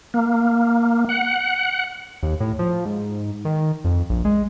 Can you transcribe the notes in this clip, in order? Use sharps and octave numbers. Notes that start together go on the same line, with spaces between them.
A#3
F#5
D#2
A2
F3
G#2
D#3
F2
A#1
G#3